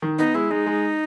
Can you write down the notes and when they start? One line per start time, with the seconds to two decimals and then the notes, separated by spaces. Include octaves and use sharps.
0.02 D#3
0.18 B3 D#4
0.34 G#3 E4
0.51 G#3 D#4
0.66 G#3